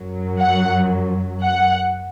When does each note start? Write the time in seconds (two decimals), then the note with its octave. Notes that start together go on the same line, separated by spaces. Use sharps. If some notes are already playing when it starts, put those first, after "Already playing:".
Already playing: F#2 F#3
0.38 F#5
1.43 F#5